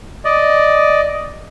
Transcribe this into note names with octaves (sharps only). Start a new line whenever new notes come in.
D5 D#5